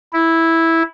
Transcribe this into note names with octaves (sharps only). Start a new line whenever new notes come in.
E4